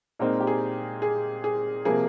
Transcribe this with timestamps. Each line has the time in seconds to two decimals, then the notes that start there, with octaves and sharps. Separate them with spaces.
0.19 A#2 G#3 C4 D#4 A#4
0.40 G4
0.47 G#4
1.02 G#4
1.44 G#4
1.85 C3 F3 A#3 G#4